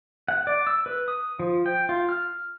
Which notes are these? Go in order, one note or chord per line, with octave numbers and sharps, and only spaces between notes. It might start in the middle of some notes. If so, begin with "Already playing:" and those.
F#5
D5
E6
B4
D#6
F3
G5
F4
F6